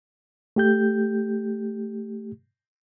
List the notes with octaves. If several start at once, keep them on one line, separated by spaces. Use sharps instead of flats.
A3 G4 G6